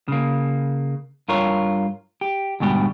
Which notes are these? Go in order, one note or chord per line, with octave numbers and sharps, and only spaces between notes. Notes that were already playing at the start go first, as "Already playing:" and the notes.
C#3 A#3
G2 F4 A#4 C#5
G4
D2 G#2 B2 G3 G4